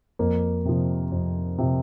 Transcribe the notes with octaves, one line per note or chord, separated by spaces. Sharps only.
F2 A#3
C3 F3
F2
C3 F3